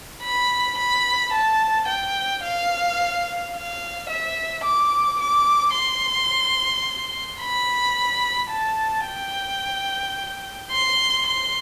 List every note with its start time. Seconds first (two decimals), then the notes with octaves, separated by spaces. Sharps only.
0.23 B5
0.78 B5
1.33 A5
1.88 G5
2.43 F5
3.55 F5
4.10 E5
4.64 D6
5.20 D6
5.75 C6
7.41 B5
8.50 A5
9.06 G5
10.72 C6
11.26 C6